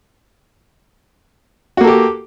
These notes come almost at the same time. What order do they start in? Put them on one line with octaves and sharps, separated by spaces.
F#4 A#3 A4 G4